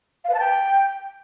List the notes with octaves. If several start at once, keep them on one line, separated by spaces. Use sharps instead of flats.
F5
B4
A5
G5